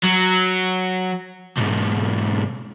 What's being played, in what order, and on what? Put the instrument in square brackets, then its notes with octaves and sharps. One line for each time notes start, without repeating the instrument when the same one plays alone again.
[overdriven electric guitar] F#3
B1 G#2